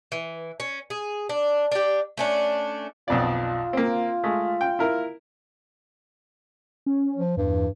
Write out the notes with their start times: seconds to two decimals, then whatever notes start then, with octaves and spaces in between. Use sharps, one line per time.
0.12 E3
0.60 C#4
0.90 G#4
1.29 D4
1.72 D4 G4
2.17 A3 C#4 D4
3.08 B1 F2 F4 D5
3.73 A#3 C4
4.23 G#3 A3
4.61 G5
4.79 E4 A#4
6.86 C#4
7.16 F3
7.37 E2 G2